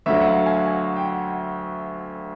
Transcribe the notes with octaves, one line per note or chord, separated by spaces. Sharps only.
D2 D3 F#3 E5
F#5
F5
G#5
G#5
G5
F#5